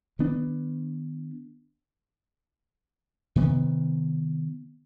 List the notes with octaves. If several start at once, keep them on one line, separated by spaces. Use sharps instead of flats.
D#3 B3 D4
C3 D#3 B3